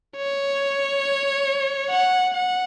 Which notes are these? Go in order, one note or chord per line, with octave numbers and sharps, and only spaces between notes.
C#5
F#5
F#5